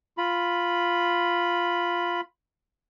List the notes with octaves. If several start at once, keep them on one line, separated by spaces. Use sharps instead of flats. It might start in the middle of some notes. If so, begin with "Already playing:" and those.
F4 B5